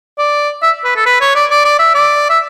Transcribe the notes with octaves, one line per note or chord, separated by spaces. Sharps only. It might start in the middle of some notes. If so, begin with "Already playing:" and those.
D5
E5
B4
A4
B4
C#5
D5
D5
D5
E5
D5
E5